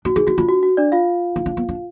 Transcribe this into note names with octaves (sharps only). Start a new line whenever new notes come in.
D4 F#4
D#4 G#4
D#4 F#4
D4 F4
F#4
F#4
D4 D5
F4 F5
D#4
D4
B3
D4